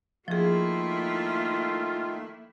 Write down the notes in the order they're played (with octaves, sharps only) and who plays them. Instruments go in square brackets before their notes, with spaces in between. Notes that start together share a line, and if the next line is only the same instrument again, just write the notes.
[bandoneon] D#3 A3 [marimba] F3 G#4 [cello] A#3 E4 [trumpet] F4